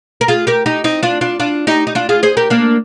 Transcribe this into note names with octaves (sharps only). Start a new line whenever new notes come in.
A#4
F4 G#4
G4 A#4
D#4 G4
C4 D#4
D4 F4
D4 F4
D4 F4
D#4 G4
D#4
D4 F4
F4 G#4
G#4 C5
G4 A#4
A#3 D4